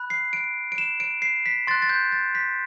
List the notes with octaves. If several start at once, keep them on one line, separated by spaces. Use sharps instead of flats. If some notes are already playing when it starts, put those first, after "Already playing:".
Already playing: B5 F#6
C7
D7
D7
E7
D7
C7
B6
C6 F#6 A6
A6
G6
A6
B6